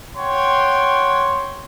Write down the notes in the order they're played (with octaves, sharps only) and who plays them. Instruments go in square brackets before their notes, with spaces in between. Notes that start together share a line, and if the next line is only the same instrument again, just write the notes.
[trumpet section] C#5 F#5 G5 C6